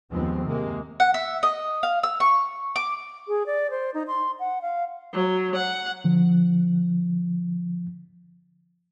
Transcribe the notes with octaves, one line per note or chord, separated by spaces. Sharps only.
D#2 F3 G#3 B3 C4
C3 G#3 A#3
F#5
E5
D#5
F5
E6
C#6
D6
G#4
D5
C5
D#4
C6
F#5
F5
F#3
F#5
D3 F3